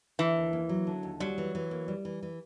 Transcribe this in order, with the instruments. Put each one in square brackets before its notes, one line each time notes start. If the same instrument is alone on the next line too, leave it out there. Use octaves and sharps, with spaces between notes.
[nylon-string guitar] D3 [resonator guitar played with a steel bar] E3
[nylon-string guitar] D#2
A#3
F#3
D3
D#2
[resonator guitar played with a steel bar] F#3 [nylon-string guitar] G3
[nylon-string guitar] E3
E3
A#3
G3
E3
E3